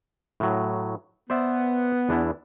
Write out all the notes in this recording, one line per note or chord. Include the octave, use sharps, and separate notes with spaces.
A2 F#3
B3 C5 D5 E5
E2 D4 E4